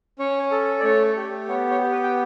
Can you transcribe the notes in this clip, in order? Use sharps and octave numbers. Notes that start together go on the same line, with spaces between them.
C#4 C#5
A4
D5
A3 C#5
G4
B3 C#5
C#5
G4
B4
G5